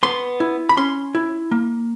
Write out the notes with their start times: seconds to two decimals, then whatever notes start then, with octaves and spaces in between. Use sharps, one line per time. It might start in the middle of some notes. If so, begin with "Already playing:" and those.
0.03 B3 C6
0.40 E4
0.69 B5
0.77 C#4 C6
1.15 E4
1.51 A#3